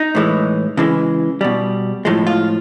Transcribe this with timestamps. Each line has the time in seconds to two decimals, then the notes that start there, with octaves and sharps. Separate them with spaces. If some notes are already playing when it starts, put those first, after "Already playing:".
Already playing: D#4
0.15 A2 E3 G#3
0.77 C#3 E3 G#3
1.41 B2 G3
2.05 A2 F3 G#3
2.27 F4